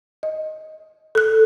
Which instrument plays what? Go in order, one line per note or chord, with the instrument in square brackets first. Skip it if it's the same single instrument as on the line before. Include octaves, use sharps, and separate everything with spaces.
[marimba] D#5
A4 F#6